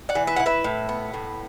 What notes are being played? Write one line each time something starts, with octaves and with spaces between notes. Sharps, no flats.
D5 F#5
E3
B4 E5
E4 F#5
B4 E5
A2
B3
A2